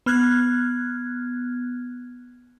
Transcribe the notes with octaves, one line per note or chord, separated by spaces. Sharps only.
B3 F6 F#6 G#6